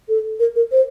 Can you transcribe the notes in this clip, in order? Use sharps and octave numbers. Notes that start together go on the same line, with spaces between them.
A4
A#4
A#4
C5